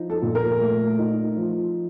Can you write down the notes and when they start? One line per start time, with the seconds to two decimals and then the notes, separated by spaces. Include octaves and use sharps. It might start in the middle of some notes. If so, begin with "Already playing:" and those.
Already playing: F3 D#4
0.10 A4
0.22 A#2
0.35 A#4
0.60 A3
0.99 D#4
1.37 F3